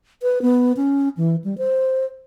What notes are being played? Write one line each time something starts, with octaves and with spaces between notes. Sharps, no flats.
B4
B3
C#4
E3
G3
C5